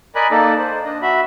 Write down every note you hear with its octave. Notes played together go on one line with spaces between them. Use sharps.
A#4 D5 D#5 G#5 B5 F#6
A#3 D#4 A4 D5
C5
D4 D#5
F#4 E5 B5